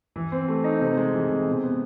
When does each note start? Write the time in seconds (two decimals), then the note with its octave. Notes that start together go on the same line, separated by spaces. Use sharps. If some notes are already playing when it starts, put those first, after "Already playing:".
0.16 E3
0.32 C4
0.48 A3
0.64 D#4
0.81 C3
0.97 G#3
1.13 E3
1.30 C3
1.47 B2
1.63 B3